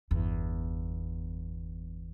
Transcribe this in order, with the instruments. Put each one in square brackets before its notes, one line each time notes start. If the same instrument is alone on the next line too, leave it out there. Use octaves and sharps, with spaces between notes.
[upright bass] G1 E2